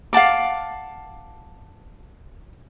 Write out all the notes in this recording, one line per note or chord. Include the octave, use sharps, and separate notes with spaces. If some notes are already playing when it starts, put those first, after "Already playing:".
F5 F#5 A5 D6